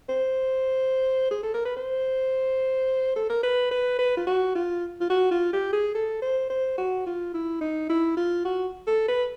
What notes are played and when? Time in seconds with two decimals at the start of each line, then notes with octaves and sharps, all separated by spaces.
0.09 C5
1.31 G#4
1.43 A4
1.54 A#4
1.65 B4
1.76 C5
3.16 A4
3.29 A#4
3.43 B4
3.71 B4
3.99 B4
4.17 F4
4.27 F#4
4.55 F4
5.01 F4
5.10 F#4
5.31 F4
5.53 G4
5.73 G#4
5.95 A4
6.22 C5
6.50 C5
6.78 F#4
7.06 F4
7.34 E4
7.61 D#4
7.89 E4
8.17 F4
8.45 F#4
8.87 A4
9.08 B4